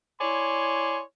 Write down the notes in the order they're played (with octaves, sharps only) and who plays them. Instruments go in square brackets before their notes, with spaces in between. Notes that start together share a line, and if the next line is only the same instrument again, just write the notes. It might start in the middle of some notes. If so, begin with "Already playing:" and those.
[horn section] E4 C#5 D5 G#5 C6